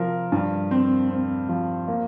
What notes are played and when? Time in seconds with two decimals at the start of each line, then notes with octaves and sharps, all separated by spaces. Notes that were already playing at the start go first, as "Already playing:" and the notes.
Already playing: C3 F3 A#4
0.32 G2
0.71 C4
1.10 C4
1.49 F3
1.88 A#3